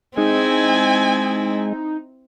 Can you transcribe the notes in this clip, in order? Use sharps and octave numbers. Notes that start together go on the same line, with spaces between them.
G#3 C4 D#4 E4 G#5